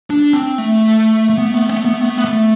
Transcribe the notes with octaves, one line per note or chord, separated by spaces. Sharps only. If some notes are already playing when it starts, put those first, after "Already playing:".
D4
C4
A3
A3
B3
A3
B3
A3
B3
A3
B3
A3
B3
A3
B3
A3